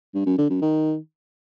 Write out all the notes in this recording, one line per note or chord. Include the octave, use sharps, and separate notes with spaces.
G2
F#2
D3
F#2
D#3